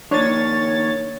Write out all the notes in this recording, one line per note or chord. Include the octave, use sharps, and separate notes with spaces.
F2 D#3 A#3 D4 C#5 A6